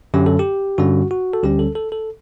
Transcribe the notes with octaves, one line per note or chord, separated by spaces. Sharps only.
F#2 D3 F#3 C#4 G4
A4
G4
G2 D3 G3 C#4 F#4
F#4
A4
D2 D3 G3 C#4 G4
A4
A4
A4